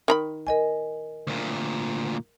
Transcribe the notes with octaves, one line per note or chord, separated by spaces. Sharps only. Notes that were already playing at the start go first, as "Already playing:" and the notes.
D#3 A#5 B5
A#4 D#5 G#5
D2 A#2